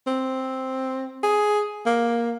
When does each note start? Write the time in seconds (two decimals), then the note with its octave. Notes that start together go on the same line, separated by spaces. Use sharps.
0.07 C4
1.23 G#4
1.86 A#3